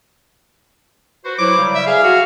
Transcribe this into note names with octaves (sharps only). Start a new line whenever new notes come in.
F#4 B4 C5
F#3 E4 C5 D6
C#3 G3
E5
G#4 F5
F#4